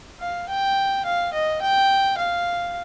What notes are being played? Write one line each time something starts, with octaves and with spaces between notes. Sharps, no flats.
F5
G5
F5
D#5
G5
F5